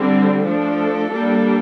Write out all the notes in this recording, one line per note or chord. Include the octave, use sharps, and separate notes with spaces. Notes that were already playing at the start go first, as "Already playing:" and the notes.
Already playing: D3 G3 C4
F3 A3 D4 A4
G3 A#3 D4